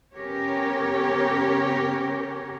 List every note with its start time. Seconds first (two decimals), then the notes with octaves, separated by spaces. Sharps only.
0.15 C#3 B3 C#4 G4 A#4 C#5